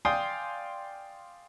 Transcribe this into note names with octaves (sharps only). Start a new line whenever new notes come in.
D5 F5 G5 G#5 C6 D#6